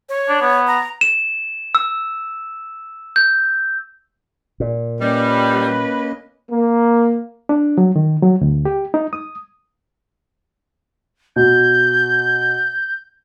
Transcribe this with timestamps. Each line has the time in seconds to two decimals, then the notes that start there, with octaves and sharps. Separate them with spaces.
0.09 C#5
0.28 D4
0.41 B3
0.67 A#5
1.01 E7
1.75 E6
3.16 G6
4.60 A#2
5.01 G3 A#3 C#4 B4 D#5
6.50 A#3
7.49 D4
7.78 F#3
7.96 D#3
8.23 F#3
8.41 D2
8.65 G4
8.94 D#4
9.13 D#6
11.36 B2 G6